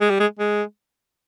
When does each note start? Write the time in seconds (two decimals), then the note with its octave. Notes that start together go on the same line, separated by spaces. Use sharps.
0.01 G#3
0.10 G3
0.20 G#3
0.39 G#3